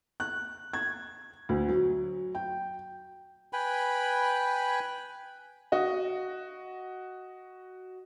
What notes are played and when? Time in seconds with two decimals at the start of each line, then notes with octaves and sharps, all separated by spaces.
0.20 F#6
0.73 G#6
1.49 D2
1.68 F#3
2.35 G5
3.53 B4 G5 G#5 B5
5.72 F#4 D#5